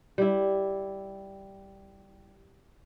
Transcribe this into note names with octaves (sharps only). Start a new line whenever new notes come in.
G3 E4